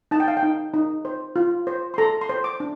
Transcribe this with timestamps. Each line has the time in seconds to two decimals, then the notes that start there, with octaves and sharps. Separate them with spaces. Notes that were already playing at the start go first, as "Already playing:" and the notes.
0.11 D#4 A5
0.20 G5
0.28 F5
0.37 G5
0.43 D#4
0.74 D#4
1.05 C5
1.36 F4
1.67 C5
1.94 C6
1.98 A4 A#5
2.21 C6
2.29 C5
2.44 D6
2.60 D4